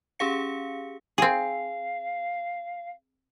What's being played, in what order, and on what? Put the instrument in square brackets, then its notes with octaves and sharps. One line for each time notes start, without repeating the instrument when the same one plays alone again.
[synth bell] C#4 G4 G#4 F5 C#7
[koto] C4 G#4 [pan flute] F5